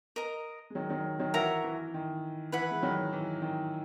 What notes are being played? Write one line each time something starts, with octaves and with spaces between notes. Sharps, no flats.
A#4 D#5 A#5
G#3
D#3 F#3
D#3 F#3
D#3 F#3
E3 F#4 A#4 E5 A#5
E3
D#3
E3 E4 B4 F#5 B5
G#3
D#3 F#3
E3
D#3